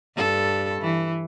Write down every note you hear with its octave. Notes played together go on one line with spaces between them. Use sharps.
G2 A4
E3